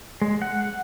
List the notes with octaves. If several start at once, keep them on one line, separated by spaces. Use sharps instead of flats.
G#3
F#5